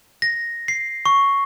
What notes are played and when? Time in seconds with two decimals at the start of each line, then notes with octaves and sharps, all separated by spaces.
0.22 A#6
0.68 C7
1.06 C#6